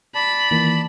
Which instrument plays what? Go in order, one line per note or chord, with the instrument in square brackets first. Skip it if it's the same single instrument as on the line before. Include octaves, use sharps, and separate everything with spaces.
[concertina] D5 A5 [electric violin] B5
[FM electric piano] D#3 E3 A#3